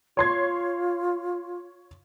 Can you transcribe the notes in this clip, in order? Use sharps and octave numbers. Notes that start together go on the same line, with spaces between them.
F4 C#5 C6 G#6